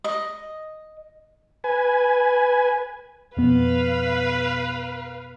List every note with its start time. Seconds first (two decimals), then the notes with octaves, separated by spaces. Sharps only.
0.04 D#5
1.64 B4 G#5
3.37 F2 B2 B3 B4 F5